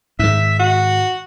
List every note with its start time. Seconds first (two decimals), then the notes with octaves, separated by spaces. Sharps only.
0.19 G#2 D#3 E5
0.59 F#4